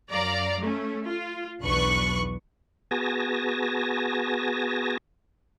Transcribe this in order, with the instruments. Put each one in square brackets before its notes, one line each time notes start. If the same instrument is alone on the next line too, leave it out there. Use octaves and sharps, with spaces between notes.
[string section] F#2 D5 F5 A#5
A3 C#4
F4
B1 E2 D4 B4 C#6 F#6
[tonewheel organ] B3 F#4 G#4 G#5 A5 A#6